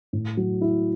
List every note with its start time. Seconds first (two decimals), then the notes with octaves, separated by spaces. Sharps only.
0.13 A2
0.37 F#3
0.61 E4